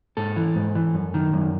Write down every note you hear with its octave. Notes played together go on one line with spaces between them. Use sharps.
G#2 A4
E3
G#2
E3
F#2
D#3
F#2